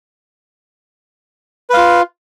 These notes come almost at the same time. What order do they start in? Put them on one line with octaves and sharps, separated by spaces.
B4 F5 F4